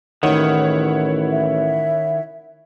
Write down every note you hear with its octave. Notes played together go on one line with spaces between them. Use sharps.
A1 D#3 E4 C#5 F#5
E5